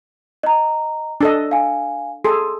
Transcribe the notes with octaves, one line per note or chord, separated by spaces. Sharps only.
D#5 A#5
D4 A4 D#5
F5 G#5
G#4 A4 C6